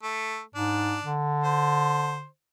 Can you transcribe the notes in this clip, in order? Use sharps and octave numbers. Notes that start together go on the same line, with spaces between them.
A3
G#2 D4
D3
C5